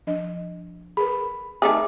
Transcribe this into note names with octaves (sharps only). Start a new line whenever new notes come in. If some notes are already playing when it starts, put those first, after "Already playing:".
F3 D4 D#5
G#4 A#4 B4 B5
D#3 A3 G4 G#4 E5 D6